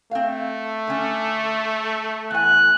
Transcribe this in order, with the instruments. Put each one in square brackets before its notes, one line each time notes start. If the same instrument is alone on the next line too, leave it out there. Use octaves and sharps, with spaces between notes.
[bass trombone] A3 [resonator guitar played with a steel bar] C4 F5
[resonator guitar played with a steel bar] D3 C#4
[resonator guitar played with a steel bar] E2 G#5 [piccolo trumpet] F#6